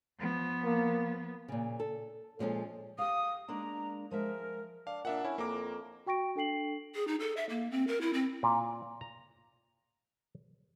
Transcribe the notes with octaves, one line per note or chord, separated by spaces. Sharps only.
F3 B3
A#3
A#2 C#3
A4
A#2 F3 G#3 C#4 A4
G4 F5 D#6
G#3 A#3 D4 A#5
F3 G#3 A#4 E5
D4 F5
A#2 D4 E5 F#5
C#4 E4
F2 A#3 A#5 D6
F#4 G5 C#6 A#6 D7
D4 A4 G5 C7 F#7
G#4
D#4
A4
E5
A#3
C4
A#4
E4
C4
A#2
A#5